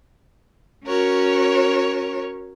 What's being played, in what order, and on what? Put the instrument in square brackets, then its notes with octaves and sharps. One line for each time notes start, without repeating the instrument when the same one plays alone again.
[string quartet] C#4 F#4 A#4 C#5